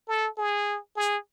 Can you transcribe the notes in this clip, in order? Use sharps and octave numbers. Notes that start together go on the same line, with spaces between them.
A4
G#4
G#4